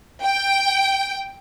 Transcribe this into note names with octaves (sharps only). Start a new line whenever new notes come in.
G5